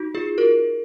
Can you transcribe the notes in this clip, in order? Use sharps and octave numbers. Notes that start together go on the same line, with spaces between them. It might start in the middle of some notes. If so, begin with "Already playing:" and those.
Already playing: D#4 F#4
F4 G#4
F#4 A#4